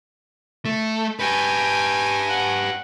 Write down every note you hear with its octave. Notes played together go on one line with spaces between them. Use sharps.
A3
G4 B4 G5 G#5
F#5